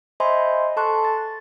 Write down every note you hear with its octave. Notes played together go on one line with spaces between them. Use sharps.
C5 D#5 E5 G#5 B5 C6
A4 A5 C6 C#6 F#6
A6